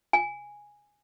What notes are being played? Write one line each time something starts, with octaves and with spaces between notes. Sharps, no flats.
G#5